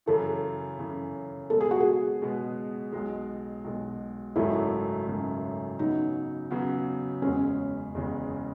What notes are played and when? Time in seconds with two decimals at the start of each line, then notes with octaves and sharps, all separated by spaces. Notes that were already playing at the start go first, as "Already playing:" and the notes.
0.06 F#2 C#3 E3 A4
0.78 F#2 C#3 E3
1.49 B2 G#3 B3 A4
1.60 G#4
1.71 F#4
1.80 G#4
2.22 B2 G#3 B3
2.93 B1 B2 G#3
3.64 B1 B2 G#3
4.36 G#1 F#2 C#3 F#3 A3 E4
5.08 G#1 F#2 C#3 F#3 A3
5.79 C#3 F#3 B3 D#4
6.51 C#3 F#3 B3
7.22 F#1 E2 C#3 G#3 B3 C#4
7.94 F#1 E2 C#3 G#3 B3